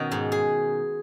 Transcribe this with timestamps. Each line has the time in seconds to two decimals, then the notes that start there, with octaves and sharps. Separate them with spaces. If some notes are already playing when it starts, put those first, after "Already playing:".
Already playing: B2 D#3 C#4 F#4 D#5 F#5
0.12 G#2
0.32 G#4